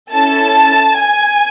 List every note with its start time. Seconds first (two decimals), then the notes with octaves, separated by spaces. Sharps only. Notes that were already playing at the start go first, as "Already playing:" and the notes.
0.13 C#4 E4 A4 A5
0.98 G#5